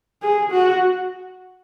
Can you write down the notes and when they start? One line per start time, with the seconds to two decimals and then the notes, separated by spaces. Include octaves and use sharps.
0.22 G#4
0.51 F#4